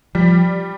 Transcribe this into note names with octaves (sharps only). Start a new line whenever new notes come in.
F3 G3